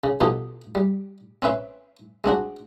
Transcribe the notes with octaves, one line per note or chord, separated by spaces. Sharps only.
C#3
B2 F3 D#4 G4 A4
G3
C4 C#4 B4 E5 C6
G#3 C4 D4 F#4